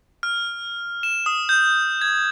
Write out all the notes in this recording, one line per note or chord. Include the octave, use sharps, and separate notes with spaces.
F6
E7
D#6
G6
G#6